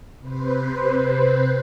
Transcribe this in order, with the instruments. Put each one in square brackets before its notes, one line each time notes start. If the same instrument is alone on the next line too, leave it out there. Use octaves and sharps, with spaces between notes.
[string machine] C3 B4 C5